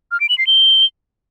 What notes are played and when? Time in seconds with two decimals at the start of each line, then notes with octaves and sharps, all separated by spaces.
0.12 F6
0.20 D7
0.29 F#7
0.38 C7
0.47 G7